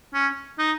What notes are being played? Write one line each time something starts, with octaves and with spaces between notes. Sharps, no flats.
C#4
D#4